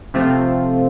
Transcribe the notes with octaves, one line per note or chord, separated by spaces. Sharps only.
C3 F3 A3 C4 F4